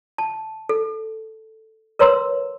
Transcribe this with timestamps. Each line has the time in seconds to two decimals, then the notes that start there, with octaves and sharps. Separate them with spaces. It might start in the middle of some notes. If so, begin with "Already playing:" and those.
0.18 A5
0.69 A4
1.99 A#4 B4 C#5 A#5 C6 E6